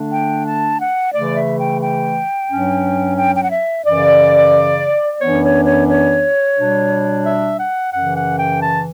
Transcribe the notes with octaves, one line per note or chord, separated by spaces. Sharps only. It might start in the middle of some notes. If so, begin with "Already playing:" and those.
Already playing: D3 A3 D4
G5
A5
F#5
C#3 E3 A3 D5
E5
G5
G5
G2 F#3 C#4
G5
G5
F#5
E5
F#2 C#3 E3 D5
F#2 E3 B3 D4 C#5
C#5
C#5
C#5
B2 G3 D4
E5
F#5
F#2 C#3 E3 F#5
F#5
G5
A5